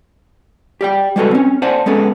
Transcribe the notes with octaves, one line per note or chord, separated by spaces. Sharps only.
G4 D5 G5
G3 G#3 F#4 A4 B4
C4 C#4
C5 D5 F#5 G#5 A5
G#3 B3 C#4 A4